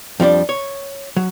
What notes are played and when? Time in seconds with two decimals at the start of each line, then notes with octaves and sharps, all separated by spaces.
0.20 F2 F3 G3 D4
0.49 C#5
1.17 F#3